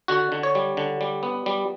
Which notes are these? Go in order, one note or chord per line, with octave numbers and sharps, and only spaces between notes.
D3 F#4
D3
C#5
G3
D3
G3
B3
G3